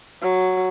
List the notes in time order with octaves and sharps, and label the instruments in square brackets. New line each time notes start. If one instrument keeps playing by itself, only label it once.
[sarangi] F#3